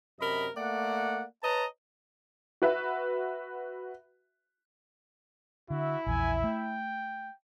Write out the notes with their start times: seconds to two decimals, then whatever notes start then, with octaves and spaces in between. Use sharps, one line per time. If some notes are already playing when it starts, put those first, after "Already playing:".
0.19 F#2 C3 A#4 D#5 B5
0.56 A3 A#3 D5 F#5
1.42 B4 C#5 D#5 A5 A#5
2.62 F#4 B4 E5
5.70 D3 E4 F#4 E5
6.06 A#1 E2 G#5
6.44 A3 G5